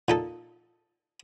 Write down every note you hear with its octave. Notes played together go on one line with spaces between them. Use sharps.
A#2 D#4 A4